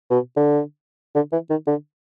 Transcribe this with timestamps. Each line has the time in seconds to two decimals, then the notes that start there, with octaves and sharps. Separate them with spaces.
0.10 B2
0.36 D3
1.15 D3
1.32 E3
1.50 D#3
1.67 D3